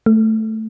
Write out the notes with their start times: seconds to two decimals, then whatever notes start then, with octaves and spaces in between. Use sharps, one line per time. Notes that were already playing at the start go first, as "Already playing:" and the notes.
0.06 A3